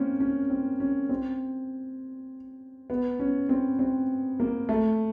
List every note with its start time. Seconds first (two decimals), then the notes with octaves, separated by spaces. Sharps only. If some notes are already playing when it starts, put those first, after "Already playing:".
Already playing: A#3 C4 C#4
0.20 C#4
0.50 C4
0.80 C#4
1.09 C4
2.90 B3
3.19 C#4
3.49 C4
3.79 C4
4.40 A#3
4.69 A3